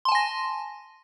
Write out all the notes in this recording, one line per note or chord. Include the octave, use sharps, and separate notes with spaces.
G#5 A5 C6 A#6